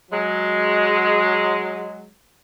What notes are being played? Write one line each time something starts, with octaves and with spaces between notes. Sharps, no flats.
F#3 G#3